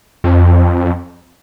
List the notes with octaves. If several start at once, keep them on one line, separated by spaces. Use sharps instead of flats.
F2